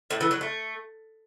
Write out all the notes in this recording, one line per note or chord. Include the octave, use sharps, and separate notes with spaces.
A2
E3
F#3
A3